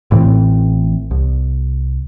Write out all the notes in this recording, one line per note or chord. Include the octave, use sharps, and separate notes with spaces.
A1 A2 E3 C4
C2